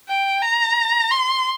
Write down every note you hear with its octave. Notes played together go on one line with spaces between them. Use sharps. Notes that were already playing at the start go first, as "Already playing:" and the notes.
G5
A#5
C6